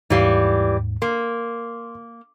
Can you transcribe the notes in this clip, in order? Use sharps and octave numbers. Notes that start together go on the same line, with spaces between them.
D#2 G#2 E3 G3 F5
A#3 C6